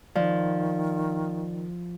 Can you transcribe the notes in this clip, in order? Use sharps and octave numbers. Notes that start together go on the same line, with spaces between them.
D#3 F3 D5